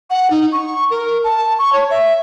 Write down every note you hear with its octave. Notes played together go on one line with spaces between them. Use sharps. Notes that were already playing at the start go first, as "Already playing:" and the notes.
F#5
D#4
C#6
A#4
A5
C#6
C#5
E5